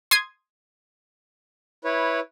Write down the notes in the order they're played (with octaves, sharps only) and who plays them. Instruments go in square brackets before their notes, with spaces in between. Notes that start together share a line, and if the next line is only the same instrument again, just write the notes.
[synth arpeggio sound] C6 D#6 G#6
[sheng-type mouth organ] E4 B4 C#5